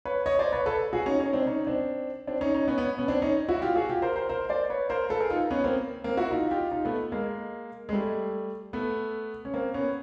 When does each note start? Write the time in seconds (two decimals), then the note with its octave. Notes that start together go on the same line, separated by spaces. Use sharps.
0.05 B4 C#5
0.26 C#5 D#5
0.39 C5 D5
0.52 B4 C#5
0.66 A4 B4
0.93 F#4 G#4
1.06 C#4 D#4
1.20 C#4 D#4
1.33 C4 D4
1.46 C#4 D#4
1.67 C4 D4
2.27 C4 D4
2.41 C#4 D#4
2.54 C#4 D#4
2.68 B3 C#4
2.78 B3 C#4
2.98 B3 C#4
3.08 C4 D4
3.22 C#4 D#4
3.48 E4 F#4
3.62 F4 G4
3.76 F#4 G#4
3.89 F4 G4
4.02 A#4 C5
4.16 A#4 C5
4.29 A#4 C5
4.49 C5 D5
4.70 B4 C#5
4.90 A#4 C5
5.10 A4 B4
5.20 G#4 A#4
5.30 D#4 F4
5.50 B3 C#4
5.64 A#3 C4
6.04 A#3 C4
6.17 E4 F#4
6.31 D#4 F4
6.51 F4 G4
6.71 D#4 F4
6.85 A3 B3
7.12 G#3 A#3
7.89 G#3
7.92 G3 A3
8.73 A3 B3
9.45 C#4
9.54 A#3 C4
9.74 B3 C#4